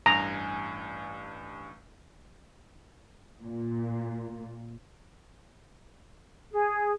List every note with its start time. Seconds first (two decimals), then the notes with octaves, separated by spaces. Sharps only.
0.06 A1 G2 G#5 A#5
3.43 A#2
6.51 G#4